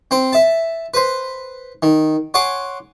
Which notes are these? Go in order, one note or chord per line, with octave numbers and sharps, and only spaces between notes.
C4 C5
E5 A5
B4 C5
D#3
C#5 F#5 G#5 C6 D6